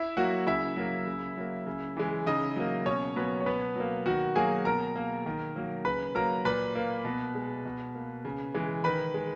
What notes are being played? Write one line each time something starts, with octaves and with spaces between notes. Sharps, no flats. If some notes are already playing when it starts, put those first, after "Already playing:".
Already playing: E4 E5
F#3 A#3 F#4 F#5
C#3 E4 E5
F#3 A#3
C#3
F#3 A#3
C#3
E3 G#3
C#3 D#4 D#5
F#3 A#3
B2 C#4 C#5
F#3 A#3 B3 B4
C#5
B2 B3 B4
F#3 A#3
D#3 F#4 F#5
F#3 A#3 G#4 G#5
B2 A#4 A#5
A#3
D#3
F#3 A#3
C#3 B4 B5
F#3 A#3 A#4 A#5
A#2 B4 B5
A#3
B2
G#3
B2
A#3
C#3
E3 G#3
D#3 B4 B5
G#3